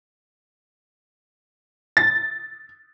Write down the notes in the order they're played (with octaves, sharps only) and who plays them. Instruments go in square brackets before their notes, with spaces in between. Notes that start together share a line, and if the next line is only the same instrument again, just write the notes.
[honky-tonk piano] A6